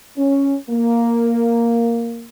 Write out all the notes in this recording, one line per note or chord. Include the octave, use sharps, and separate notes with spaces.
C#4
A#3